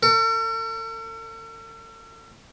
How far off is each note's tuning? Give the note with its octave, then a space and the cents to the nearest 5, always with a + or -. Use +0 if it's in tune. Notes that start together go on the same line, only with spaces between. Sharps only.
A4 +45